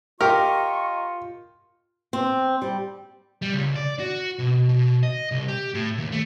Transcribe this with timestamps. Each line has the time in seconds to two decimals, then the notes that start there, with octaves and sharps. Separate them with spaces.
0.21 F4 G4 A#4 D#5 A#5 C#6
2.13 C4
2.62 G3
3.42 G3
3.54 C#2
3.76 D5
4.00 F#4
4.39 B2
4.69 B2
5.03 D#5
5.31 C2
5.48 G4
5.74 A2
5.98 D#2
6.12 A3